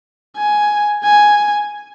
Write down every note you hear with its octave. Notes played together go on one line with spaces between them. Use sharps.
G#5
G#5